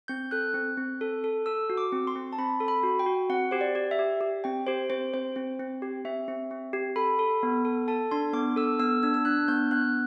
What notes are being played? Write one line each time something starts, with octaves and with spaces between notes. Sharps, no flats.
C4 G6
A4 F#6
C4
C4
A4
A4
A4 E6
F#4
D6
C4
C6
C4
A5
C4 B5
A4
B5
F#4
G5
F#4
C4 F#5
G4 C5
D5
G4
E5
G4
G4
C4 G5
G4 C5
C4 C5
C4 C5
C4
C4
G4
C4 E5
C4
C4
G4
A4 B5
A4
B3
A4
A4 A5
D4 C6
B3 D6
A4 E6
B3 E6
D4 E6
E6
D4 F#6
B3 G6
B3 F#6